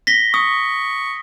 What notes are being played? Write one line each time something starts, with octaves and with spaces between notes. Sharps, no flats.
A#6 B6 G7
C#6 D#6